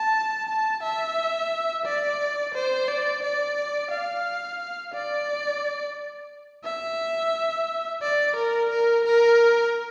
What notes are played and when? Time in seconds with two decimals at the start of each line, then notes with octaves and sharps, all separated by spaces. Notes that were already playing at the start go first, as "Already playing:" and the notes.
Already playing: A5
0.49 A5
0.83 E5
1.86 D5
2.55 C5
2.88 D5
3.22 D5
3.91 F5
4.94 D5
6.65 E5
8.02 D5
8.36 A#4
8.70 A#4
9.04 A#4